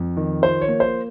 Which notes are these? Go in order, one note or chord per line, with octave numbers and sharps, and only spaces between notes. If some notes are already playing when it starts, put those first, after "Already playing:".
Already playing: F2
D#3
F3 C5
C#5
A#3
C5